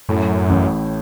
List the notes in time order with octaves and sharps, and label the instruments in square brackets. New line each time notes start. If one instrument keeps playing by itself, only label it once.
[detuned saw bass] F#2 [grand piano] A2
[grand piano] A1